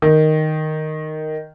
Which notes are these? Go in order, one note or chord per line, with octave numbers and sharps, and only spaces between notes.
D#3